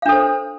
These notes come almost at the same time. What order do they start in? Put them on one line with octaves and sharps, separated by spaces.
F5 D4 A4 C5